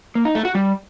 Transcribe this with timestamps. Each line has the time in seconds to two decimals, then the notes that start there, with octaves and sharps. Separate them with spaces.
0.15 A#3
0.25 D#4
0.35 A3
0.45 F#4
0.55 G3